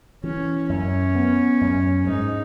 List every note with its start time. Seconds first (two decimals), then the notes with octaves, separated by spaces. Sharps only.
0.24 E3 C#4
0.69 F#2 C#4
1.15 B3
1.61 F#2
2.06 G#2 D#4